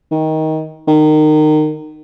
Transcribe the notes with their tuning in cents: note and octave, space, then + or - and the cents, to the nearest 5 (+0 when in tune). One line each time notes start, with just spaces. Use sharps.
D#3 +20
D#3 -25